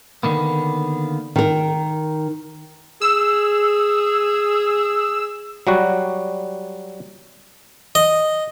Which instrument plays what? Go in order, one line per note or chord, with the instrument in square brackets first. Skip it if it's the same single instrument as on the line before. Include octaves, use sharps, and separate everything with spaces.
[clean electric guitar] D3 D#3 A#3 B3
[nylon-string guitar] D#3 A#4
[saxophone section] G#4 [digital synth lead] E6
[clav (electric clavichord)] F#3 G3 F#4
[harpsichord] D#5